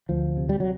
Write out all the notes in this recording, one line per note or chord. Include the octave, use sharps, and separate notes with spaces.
D2 F3
C3
G3
F#3